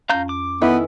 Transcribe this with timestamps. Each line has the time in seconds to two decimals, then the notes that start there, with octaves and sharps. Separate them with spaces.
0.10 F2 C#4 F5 A#5 G6
0.29 D6
0.62 D#3 B3 E4 A4 B4 G#5